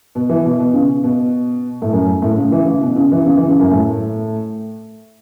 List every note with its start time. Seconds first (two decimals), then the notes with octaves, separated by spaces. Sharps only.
0.15 B2
0.29 E3
0.45 B2
0.59 B2
0.74 C#3
1.04 B2
1.82 A2
1.93 F#2
2.22 A2
2.37 C#3
2.52 E3
2.67 C#3
2.82 B2
2.96 C#3
3.12 E3
3.26 C#3
3.37 E3
3.48 C#3
3.60 F#2
3.71 A2